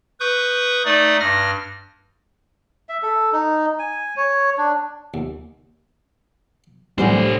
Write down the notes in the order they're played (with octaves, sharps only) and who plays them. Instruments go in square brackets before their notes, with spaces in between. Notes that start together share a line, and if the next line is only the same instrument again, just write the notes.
[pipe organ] B4 C#6 D#6 G6
A3 D#4 D5 D#6
G2 F6 A#6
[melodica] E5
A4
D#4
G#5
C#5
D4
[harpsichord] D#2
[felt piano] A2 [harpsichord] E3 F#3 C#4 [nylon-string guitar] G3 [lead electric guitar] D4 C5